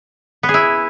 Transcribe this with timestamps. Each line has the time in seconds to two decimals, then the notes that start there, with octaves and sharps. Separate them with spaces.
0.43 B3
0.49 G#4
0.54 E4